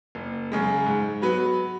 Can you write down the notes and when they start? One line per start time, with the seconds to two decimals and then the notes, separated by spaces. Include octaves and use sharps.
0.15 F#1
0.52 F#2 C#3 G#3
0.86 G#2
1.22 F#3 B3 F#4 B4